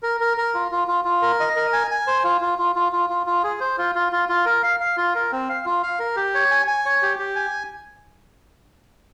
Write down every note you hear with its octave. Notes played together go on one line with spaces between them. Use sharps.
A#4
A#4
A#4
F4
F4
F4
F4
A#4
D#5
A#4
G#5
G#5
C5
F4
F4
F4
F4
F4
F4
F4
G#4
C5
F4
F4
F4
F4
A#4
F5
F5
F4
A#4
C4
F5
F4
F5
A#4
G4
C#5
G#5
G#5
C#5
G4
G4
G#5